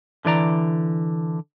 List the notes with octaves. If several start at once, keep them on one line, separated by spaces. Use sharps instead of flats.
D3 E3 D5 A#5